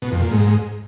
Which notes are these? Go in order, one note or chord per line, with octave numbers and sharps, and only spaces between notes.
B2
F2
A#2
G#2